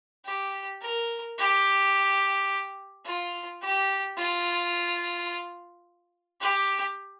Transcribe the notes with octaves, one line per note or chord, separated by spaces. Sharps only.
G4
A#4
G4
F4
G4
F4
G4